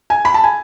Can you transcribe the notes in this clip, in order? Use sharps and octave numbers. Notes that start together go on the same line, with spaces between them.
G#5
B5
A5
G#5